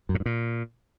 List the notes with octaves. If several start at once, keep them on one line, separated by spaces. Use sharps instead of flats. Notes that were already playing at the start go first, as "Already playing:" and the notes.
F#2
A2
G2
A#2